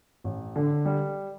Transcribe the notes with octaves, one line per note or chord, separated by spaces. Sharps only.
A1
D3
G3